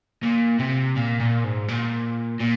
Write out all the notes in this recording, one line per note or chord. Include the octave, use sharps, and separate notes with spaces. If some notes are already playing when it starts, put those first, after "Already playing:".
A#2
C3
A#2
A#2
G#2
A#2
A#2